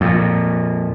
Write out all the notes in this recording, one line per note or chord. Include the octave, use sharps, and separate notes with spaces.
F2 A#2